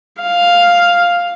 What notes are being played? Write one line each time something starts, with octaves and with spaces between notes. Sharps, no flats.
F5